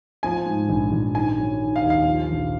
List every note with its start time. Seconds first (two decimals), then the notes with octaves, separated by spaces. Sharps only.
0.23 F3 G#5
0.46 G#2
0.69 A#1
0.92 A#1
1.15 D#3 G#5
1.38 F#3
1.61 D#3
1.76 F5
1.82 D#2
1.90 F5
2.06 F3
2.29 A#1